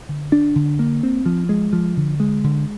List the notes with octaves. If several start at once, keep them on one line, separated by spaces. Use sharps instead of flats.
D3
D4
D3
A#3
C4
F3
G#3
F3
D3
G#3
D3